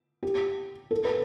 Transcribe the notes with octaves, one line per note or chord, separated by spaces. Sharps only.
G4
A4
B4